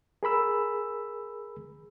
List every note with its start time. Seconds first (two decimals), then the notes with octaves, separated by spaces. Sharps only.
0.23 G#4 A#4 B5 E6